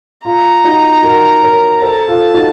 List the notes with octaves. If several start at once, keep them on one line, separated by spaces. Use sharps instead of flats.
F4 A#5
D#4 F#4
F#4 A#4
A#4 C#5
A4 C5 A5
F4 A4
D#4 F#4